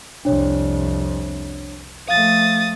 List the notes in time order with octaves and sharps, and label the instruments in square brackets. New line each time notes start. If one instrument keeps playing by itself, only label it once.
[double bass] C2 F2 [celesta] D4 C#5
[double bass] F3 A3 [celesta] F5 [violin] D#6 A6